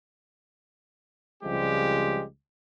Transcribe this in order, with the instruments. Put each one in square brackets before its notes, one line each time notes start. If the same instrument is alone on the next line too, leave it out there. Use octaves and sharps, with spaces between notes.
[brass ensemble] C#2 F3 G3 G#3 C4 G4